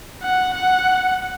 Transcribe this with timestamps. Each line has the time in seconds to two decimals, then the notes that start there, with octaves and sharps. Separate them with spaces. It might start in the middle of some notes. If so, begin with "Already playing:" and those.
0.22 F#5
0.54 F#5